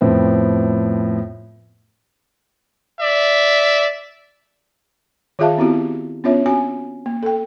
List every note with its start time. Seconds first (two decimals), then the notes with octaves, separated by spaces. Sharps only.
0.01 F2 A2 B3 C4
3.01 D5 E5
5.39 D#3 F4 G#4 E5 F5 A5
5.58 B3 C4 E4 F#4 G4
6.24 B3 C#4 D4 F4 C#5 E5
6.46 C4 F#4 G#5
7.06 A#3
7.23 A4 G5